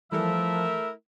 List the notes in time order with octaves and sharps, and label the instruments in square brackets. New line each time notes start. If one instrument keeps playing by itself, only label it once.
[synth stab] E3 G3 A4 [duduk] F3 [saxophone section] A3 E4 A#4 [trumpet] E5